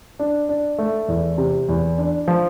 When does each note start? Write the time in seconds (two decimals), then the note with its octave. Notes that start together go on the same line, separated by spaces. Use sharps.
0.19 D4
0.49 D4
0.79 A3
1.08 E2
1.38 C3
1.69 E2
1.98 D4
2.28 F3